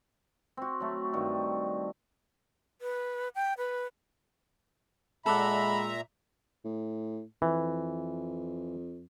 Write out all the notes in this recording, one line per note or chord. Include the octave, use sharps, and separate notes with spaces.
C4 F#4
F#3 A3
G2 D#3 F#4
B4
G5
B4
A#2 G#3 A4 D5 E5 F#5 A#5 B5
A2
F2 E3